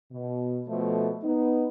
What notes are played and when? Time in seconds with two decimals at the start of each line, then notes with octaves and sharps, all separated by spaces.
0.12 B2
0.68 B2 F3 A3
1.24 B3 D#4